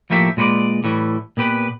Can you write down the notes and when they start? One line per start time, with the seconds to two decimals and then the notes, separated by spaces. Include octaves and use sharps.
0.10 A2 F3 A3 A#3 G4 E5
0.37 A#2 G#3 B4 C5 D5
0.84 A2 E3 G3
1.37 A#2 B3 G4 B4